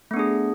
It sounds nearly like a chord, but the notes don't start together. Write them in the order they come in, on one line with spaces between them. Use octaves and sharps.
A3 B3 D4 G#4